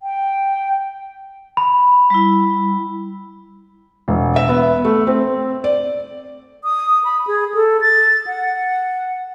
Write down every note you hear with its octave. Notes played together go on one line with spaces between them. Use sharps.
G5
B5
G3 E4
E1
E5
B3
A3
C4
D5
D#6
B5
G#4
A4
A6
F#5